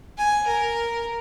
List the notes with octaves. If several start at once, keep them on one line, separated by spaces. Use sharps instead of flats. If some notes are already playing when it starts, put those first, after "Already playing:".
G#5
A#4